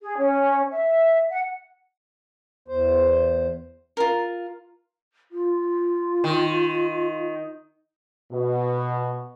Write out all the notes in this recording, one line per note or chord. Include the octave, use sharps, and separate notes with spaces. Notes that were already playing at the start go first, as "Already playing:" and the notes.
G#4
C#4
E5
F#5
E2 C5
F4 A#4
F4
D#3
B2